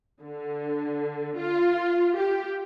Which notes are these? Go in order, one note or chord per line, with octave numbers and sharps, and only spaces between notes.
D3
F4
G4